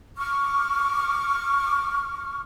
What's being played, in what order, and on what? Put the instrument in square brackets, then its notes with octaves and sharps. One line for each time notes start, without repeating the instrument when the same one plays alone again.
[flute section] C#6 D6 F6